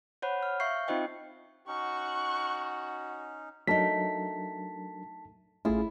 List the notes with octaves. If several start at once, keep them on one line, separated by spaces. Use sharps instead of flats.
C5 C#5 F#5 B5
F6
E5 F5 C#6 G6 C7
C4 D#4 F4 C5 D#5 G5
C#4 D#4 F#4 C#6 F#6
F#3 A3 D4 D#4 A#4 A5 B6
A1 A3 C#4 E4 F4 G#4